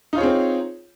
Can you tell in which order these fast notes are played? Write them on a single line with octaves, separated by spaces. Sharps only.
D#4 F4 C#5 G#4 C4